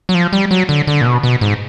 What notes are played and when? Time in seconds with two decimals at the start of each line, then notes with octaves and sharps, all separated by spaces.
0.09 F#3
0.15 F3
0.33 G3
0.51 F#3
0.69 D3
0.87 D3
1.01 A#2
1.05 B2
1.23 B2
1.41 G#2